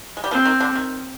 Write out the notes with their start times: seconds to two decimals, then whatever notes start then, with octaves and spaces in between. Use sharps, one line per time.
0.17 G#3
0.24 G3
0.31 F3 C4
0.46 D#3
0.60 D3
0.75 D#3